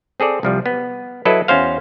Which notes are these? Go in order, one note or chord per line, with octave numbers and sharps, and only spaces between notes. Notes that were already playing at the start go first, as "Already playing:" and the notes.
C4 G#4 A4 D5
C2 F3 G3
B3
F#3 E4 A4 B4 D#5
E2 C#4 F#4 C5 F5